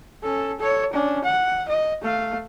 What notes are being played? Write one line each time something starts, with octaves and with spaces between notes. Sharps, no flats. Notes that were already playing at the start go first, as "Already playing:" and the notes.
C#4 A4
A4 C#5
C#4 D4
F#5
D#5
A3 F5